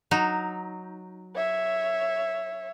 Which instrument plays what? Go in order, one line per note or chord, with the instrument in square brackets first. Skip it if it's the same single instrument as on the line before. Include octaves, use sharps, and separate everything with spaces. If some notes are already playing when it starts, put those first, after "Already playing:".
[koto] F#3 D#4
[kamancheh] C#5 E5